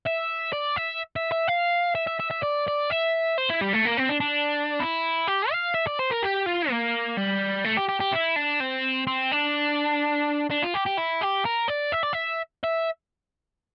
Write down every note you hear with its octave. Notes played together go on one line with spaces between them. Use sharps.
E5
D5
E5
E5
E5
F5
E5
E5
E5
E5
D5
D5
E5
C5
E4
G3
A3
A#3
C4
D4
D4
E4
G4
F5
E5
D5
C5
A#4
G4
F4
A#3
G3
A3
G4
G4
G4
E4
D4
C4
C4
D4
D4
F4
G4
G4
E4
G4
A#4
D5
E5
D5
E5
E5